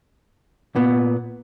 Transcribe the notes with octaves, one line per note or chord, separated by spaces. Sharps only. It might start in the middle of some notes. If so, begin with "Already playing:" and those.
A#2 B3